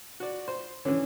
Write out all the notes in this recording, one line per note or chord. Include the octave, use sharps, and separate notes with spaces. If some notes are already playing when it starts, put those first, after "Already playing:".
F#4 D5
C5
D3 E3 C#4